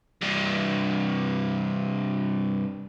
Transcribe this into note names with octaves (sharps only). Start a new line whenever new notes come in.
G2 C3